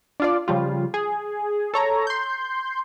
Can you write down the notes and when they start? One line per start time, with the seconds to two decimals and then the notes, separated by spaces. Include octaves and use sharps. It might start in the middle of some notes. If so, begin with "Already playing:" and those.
0.20 D4 F4 D5
0.48 C#3 F3 G3 F4
0.94 G#4
1.74 A4 C#5 A#5
2.07 C6 G6